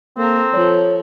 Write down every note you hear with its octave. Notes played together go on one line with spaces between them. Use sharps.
A#3 C4 A4 A#4
F3 A4 C#5